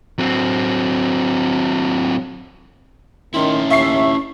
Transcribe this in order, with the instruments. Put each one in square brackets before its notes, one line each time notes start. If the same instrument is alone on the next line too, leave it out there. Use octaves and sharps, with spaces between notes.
[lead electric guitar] F#3 C4
[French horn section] D#3 [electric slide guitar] C#4 E4 [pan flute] C6
[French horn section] D#2 [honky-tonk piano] E5 C7 [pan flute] C#6